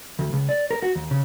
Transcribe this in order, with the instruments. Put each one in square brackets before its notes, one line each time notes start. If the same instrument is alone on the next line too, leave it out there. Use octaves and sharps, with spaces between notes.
[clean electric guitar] D2
C#2
D5
A#4
F#4
D#2
C#3